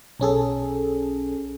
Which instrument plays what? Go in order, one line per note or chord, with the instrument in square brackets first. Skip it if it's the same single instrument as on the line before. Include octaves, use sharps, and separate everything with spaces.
[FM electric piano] B1 C#4 G#4 A4